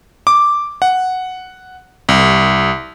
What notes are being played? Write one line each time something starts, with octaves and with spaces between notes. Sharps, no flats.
D6
F#5
C2